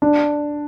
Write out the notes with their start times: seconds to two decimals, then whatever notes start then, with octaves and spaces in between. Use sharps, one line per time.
0.02 D4